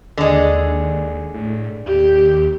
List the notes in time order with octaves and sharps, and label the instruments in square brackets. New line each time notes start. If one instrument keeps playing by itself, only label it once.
[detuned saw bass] D#2 [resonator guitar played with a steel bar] D3 G#3
[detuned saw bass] A2
[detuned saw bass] D#2 [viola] G4